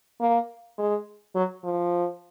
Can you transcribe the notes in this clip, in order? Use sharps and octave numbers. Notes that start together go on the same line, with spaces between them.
A#3
G#3
F#3
F3